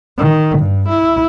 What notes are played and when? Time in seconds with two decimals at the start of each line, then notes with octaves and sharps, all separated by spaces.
0.18 D#3
0.59 G2
0.89 E4